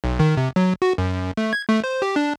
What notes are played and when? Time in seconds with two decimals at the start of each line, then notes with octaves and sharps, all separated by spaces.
0.04 B1
0.20 D#3
0.37 C3
0.56 F#3
0.82 F#4
0.98 F#2
1.37 A3
1.53 G#6
1.69 A3
1.84 C5
2.02 G4
2.16 D4